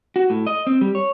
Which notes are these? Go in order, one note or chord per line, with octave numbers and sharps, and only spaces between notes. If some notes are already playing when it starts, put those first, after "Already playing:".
F#4
A2
D#5
C4
G3
C#5